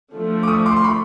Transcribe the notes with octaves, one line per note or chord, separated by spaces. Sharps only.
D3 F3 A3
D6
C#6 D#6
C6 D6
C6
B5 C#6